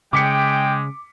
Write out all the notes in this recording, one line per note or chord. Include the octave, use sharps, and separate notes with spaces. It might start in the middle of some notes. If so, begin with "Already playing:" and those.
C#3 G#3 G5 D6 B6 C#7